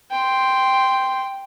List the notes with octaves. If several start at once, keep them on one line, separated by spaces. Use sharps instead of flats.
G5 C6